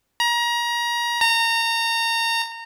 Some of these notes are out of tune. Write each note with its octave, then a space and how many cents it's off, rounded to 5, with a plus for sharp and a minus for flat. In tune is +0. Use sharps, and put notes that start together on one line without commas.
A#5 +30
A#5 -25